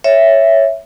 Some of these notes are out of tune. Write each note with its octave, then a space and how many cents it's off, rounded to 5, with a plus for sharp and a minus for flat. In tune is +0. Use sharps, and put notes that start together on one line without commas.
C#5 +0 E5 +0